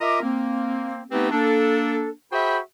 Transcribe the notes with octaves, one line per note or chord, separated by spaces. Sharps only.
F4 A#4 D#5 E5 A#5 D6
A#3 C4
A3 B3 C4 D#4 G4 B4
A#3 D4 A4
F#4 G#4 C5 E5 G5 B5